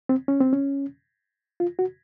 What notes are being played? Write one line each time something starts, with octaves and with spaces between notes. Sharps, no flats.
C4
C#4
C4
C#4
F4
F#4